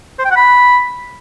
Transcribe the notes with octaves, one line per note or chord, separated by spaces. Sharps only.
C5
G5
F#5
B5